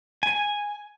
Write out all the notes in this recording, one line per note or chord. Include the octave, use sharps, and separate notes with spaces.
G#5